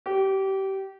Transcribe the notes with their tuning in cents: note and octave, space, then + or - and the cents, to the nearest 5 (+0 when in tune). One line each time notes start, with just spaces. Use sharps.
G4 -25